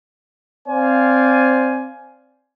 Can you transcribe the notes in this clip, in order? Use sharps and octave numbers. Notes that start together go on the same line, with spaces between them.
C4 C5 D5 F5 G#5